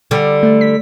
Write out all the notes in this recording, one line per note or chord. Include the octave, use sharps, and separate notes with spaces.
D3 G3
A3
B6